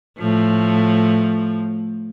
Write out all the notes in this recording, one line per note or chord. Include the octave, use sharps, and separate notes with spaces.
A2 F3